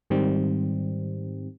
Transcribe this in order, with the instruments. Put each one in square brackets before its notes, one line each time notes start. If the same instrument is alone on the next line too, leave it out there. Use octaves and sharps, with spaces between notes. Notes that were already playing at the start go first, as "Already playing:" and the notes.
[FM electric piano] G#2 D#3 G3 C4